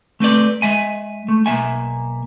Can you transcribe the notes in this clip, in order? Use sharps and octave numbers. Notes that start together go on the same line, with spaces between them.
A3 C4 B4 D5
G#3 E5 G#5
A3
B1 A#3 E5 G#5